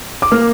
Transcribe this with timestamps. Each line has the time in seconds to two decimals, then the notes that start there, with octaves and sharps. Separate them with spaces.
0.22 D6
0.32 A#3 F6